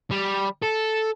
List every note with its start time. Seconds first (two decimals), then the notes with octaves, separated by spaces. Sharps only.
0.11 G3
0.62 A4